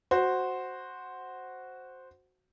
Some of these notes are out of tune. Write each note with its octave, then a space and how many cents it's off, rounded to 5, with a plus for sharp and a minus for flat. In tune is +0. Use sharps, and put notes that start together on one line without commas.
F#4 +0 C5 +0